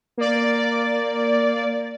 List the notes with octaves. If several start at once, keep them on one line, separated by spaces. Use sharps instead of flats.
A#3 D5